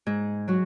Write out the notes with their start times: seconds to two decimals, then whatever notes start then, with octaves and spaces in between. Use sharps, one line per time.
0.06 G#2 G#4
0.48 F#3 F#4